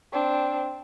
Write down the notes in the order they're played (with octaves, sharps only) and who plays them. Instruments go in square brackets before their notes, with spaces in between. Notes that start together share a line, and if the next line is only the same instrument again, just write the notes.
[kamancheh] C4 D4